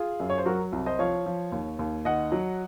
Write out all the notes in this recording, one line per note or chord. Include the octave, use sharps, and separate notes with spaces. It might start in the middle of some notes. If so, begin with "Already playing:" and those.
Already playing: F4 G#4
F#2
C#5
C5
F#3 F#4 A#4
C2
C5 D#5
F3 C#5 F5
F3
D#2
D#2
D#3 D#5 F#5
F#3